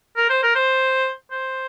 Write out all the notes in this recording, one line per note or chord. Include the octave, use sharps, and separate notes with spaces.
A#4
C5
A#4
C5
C5